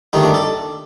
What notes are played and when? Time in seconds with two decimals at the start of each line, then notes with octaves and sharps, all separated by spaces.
0.13 G2 D#3 A3 D#4
0.23 D4
0.34 A4